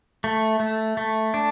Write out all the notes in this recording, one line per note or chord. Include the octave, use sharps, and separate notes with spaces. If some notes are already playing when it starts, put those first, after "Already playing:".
A3
A3
A3
D4